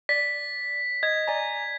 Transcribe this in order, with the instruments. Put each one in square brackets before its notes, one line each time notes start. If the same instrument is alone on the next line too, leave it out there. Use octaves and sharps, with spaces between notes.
[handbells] D5 [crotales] B6
[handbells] D#5 [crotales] G#6
[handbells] D5 G#5 A#5